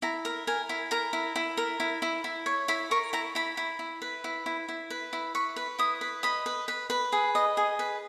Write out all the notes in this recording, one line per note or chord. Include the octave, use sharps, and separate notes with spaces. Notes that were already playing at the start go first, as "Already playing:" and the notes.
E4 A#5
A#4
A#4 G#5
E4
A#4 A#5
E4
E4
A#4
E4
E4
E4
C#5
E4 B5
A#4 C#6
E4 A#5
E4 B5
E4
E4
B4
E4
E4
E4
B4
E4
B4 C#6
B4
E4 D#6
B4
D#5 B5
B4
B4
B4
G#4
D#5
G#4
B4